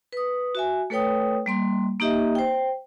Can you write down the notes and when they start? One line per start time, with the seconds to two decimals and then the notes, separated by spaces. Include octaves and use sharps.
0.12 B4 D#6
0.55 F#4 E5 G#5
0.90 A3 A4 B4 C#5 G5 D#6
1.46 G3 A#3 C6
2.00 A#3 D#4 G4 D#5 E5
2.35 C5 G5